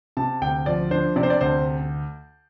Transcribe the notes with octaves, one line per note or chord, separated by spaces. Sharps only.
C3 A5
D2 G5
F3 D5
D4 C5
C3 D5
C5
D5
D2 C5